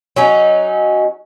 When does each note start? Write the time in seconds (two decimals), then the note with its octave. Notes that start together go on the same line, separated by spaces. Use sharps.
0.16 F#3 C#4 D#4